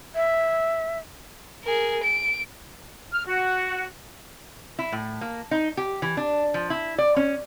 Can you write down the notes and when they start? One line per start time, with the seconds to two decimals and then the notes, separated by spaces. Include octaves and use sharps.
0.15 E5
1.64 G#4 A#4
2.03 D7
3.12 F6
3.27 F#4
4.79 E4
4.92 A2
5.21 A#3
5.51 D#4
5.77 G4
6.02 E3
6.17 D4
6.54 F3
6.70 E4
6.98 D5
7.16 C#4